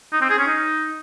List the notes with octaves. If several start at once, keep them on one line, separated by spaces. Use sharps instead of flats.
D#4
C4
G#4
C#4
D#4